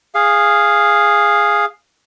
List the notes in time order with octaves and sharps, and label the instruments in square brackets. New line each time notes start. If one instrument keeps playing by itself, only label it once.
[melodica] G#4 F5